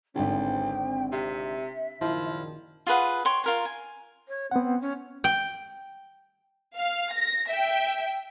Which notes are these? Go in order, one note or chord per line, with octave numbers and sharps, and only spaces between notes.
G#1 C#2 D3 C4 G5
C3 E5
F#1 A#2 D#3 F3 E4
F4 G#4 B4 F#5
C#5 G5 C6 C#6
F4 A#4 G#5
G#5
C#5
B3 C4 F#5
C#4
G5
F5
A#6
E5 G5